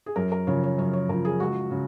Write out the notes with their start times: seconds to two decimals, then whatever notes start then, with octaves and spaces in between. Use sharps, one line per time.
0.06 G#4
0.16 F#2 A#4
0.32 A#4
0.47 C#3 F3 C#5
0.63 C#5
0.78 F#2 C#5
0.93 C#5
1.09 C#3 F3 A#4
1.25 G#4
1.40 C#2 F#4
1.71 C#3